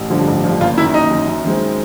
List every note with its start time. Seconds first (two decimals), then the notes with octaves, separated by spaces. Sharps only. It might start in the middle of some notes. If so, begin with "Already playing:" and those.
Already playing: A1
0.10 G2 D3 F3
0.28 A1
0.44 G2 D3 F3
0.61 F#1 F4
0.77 F#2 D#3 E4
0.94 F#1 D#4
1.11 F#2 D#3
1.28 F#2
1.44 D#3 G#3 C4